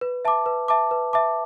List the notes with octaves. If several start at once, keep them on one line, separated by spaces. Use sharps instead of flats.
B4
E5 A5 D6
B4
E5 A5 D6
B4
E5 A5 D6